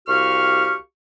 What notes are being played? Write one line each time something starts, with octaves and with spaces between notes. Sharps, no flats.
C2 F#4 G4 F5 C#6 F6